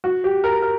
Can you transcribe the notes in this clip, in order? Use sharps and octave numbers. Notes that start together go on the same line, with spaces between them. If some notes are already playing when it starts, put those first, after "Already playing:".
F#4
G4
A#4
A#4